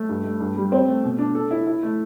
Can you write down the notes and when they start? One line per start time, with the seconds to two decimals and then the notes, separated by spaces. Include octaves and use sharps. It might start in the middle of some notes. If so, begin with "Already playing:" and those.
Already playing: A3
0.09 G2
0.24 A3
0.40 G2
0.56 G3
0.72 C4
0.88 A3
1.04 B2
1.18 D4
1.35 A4
1.51 E4
1.67 E4
1.83 A3